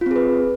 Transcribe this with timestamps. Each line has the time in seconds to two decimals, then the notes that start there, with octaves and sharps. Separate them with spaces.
0.01 F4
0.06 C4
0.11 G#4
0.16 B4